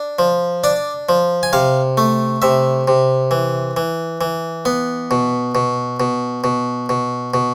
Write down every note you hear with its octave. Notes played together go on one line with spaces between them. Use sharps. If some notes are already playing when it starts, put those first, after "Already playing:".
Already playing: D4
F3
D4 D5
F3
G#5
C3 F5
A3
C3 E5
C3
E3
E3
E3
B3
B2
B2
B2
B2
B2
B2